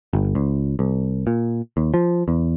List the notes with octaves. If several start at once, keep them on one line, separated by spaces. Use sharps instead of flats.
G1
C#2
C2
A#2
D#2
F3
E2